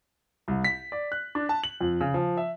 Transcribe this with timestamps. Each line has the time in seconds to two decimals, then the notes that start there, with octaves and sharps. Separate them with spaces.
0.48 C2
0.64 B6
0.92 D5
1.12 F#6
1.35 D4
1.49 A5
1.64 F#7
1.81 F2
2.01 C#3
2.14 F3
2.37 E5